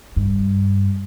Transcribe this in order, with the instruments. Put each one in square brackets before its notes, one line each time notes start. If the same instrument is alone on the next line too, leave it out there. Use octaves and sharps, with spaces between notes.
[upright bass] G2